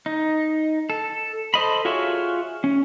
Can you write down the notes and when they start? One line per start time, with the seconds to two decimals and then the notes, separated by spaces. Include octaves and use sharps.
0.06 D#4
0.90 A4
1.54 A4 C5 D#5 B5
1.85 F4 F#4 G#4 C#5 E5
2.64 C#4